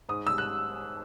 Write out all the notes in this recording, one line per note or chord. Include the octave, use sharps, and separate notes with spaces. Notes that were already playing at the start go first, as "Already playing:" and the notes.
G#2 D#6
G3 E6
F#6